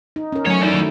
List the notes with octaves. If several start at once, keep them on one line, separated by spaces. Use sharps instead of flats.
D#4
C#4 A#4
F#3 A3 C5 C#5 G#5
E3 D#4 E4 D5
D#3 F#3 A3